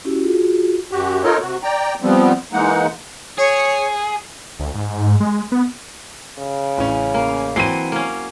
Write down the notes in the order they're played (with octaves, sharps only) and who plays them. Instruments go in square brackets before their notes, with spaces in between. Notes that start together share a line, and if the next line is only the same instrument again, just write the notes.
[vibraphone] C#4 E4 F#4 G4
F4 F#4 G#4
[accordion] F#2 F#4 G4
D#4 F4 A4 A#4 C#5 D#5
C3 F#4
D5 G5 A#5
F3 G3 B3 C4
E3 G#3 A#3 D#4 F#5
[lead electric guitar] G#4 [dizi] C#5
[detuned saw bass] D2
G#2
G#3
B3
[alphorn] C#3
[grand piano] A1 C#4
[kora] A#3
[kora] E3 F#3 C4 [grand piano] C7 D#7
[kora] A#3 C#4